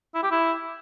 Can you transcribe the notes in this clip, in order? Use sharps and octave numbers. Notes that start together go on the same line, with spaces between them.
E4
G4
E4